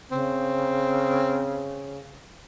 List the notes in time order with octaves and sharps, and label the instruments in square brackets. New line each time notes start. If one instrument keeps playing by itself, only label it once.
[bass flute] C#3 [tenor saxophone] C4